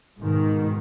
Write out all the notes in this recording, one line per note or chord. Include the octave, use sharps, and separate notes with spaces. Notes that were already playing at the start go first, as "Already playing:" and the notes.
G#2 B2 D#3